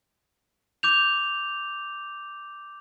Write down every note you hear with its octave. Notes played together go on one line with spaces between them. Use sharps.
D6 G6 F7